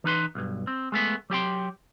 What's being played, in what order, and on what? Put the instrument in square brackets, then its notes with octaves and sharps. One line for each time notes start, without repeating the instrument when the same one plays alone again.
[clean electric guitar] E3 D#4 B4 C6
B1 G2
C4
G#3 A3 B3
F#3 G4 G5 C6